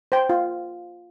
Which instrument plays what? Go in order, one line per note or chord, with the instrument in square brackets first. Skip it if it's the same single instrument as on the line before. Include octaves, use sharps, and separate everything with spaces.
[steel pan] C5 G5
F4